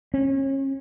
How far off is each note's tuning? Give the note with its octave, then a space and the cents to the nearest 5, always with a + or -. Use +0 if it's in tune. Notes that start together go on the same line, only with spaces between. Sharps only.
C#4 -30